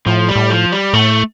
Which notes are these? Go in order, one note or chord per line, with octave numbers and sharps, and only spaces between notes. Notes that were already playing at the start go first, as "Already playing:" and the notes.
A2 F3
G3
A2
F3
G3
A2 A3